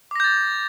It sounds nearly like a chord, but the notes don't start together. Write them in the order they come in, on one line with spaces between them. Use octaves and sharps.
D6 A#6 G6 A6